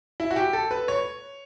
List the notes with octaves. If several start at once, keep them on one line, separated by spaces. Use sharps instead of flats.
E4
F#4
G4
A4
B4
C#5